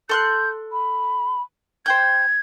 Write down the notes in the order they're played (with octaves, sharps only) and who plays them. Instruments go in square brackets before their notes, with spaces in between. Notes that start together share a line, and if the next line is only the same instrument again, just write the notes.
[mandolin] A4 C6 F#6 [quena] G6
[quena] B5
[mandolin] C5 G5 G6 [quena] G#6